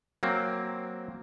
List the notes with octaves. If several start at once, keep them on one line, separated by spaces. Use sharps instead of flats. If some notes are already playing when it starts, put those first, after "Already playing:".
F#3 A#3 C4